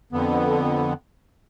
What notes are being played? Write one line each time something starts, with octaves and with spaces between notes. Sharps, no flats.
F2 D3 B3